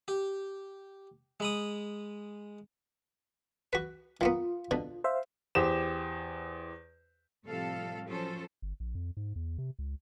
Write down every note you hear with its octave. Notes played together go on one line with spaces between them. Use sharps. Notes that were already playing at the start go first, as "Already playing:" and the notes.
G4
G#3 B5 D#6
F#4 B4
D#3 A#3 B3 F4
B2 D3
C5 E5 F5
E2 G4 C5 E7
A2 C3 F3 G3 A4 F5
F3 F#3 C#4 A4 C5
G1
A#1
F2
G#2
E2
C3
C#2